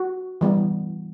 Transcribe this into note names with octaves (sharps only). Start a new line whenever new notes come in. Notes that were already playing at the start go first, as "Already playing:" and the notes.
Already playing: F#4
E3 G3 B3